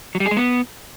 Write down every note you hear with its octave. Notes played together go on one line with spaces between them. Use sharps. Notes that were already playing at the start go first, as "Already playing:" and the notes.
F#3
G3
G#4
G#3
B3